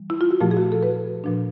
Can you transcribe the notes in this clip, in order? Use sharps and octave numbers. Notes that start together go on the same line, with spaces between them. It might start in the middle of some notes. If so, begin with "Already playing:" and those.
Already playing: E3 G3
E4
F4
F#4
A#2 F3 A3 G4
G#4
F#4
G4
A4
B4
A#2 F3 A3 D4